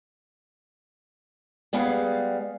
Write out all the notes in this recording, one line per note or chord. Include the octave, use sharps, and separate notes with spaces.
G3 G#3 B3 G#4 F5 F#5